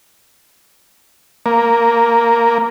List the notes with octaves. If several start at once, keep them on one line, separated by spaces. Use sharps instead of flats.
A#3